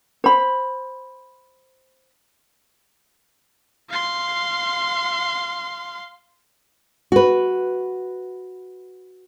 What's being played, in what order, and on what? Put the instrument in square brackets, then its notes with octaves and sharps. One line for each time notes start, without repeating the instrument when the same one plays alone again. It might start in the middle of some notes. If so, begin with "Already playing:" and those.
[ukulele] C5 B5
[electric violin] F5 C6
[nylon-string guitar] F#4 B4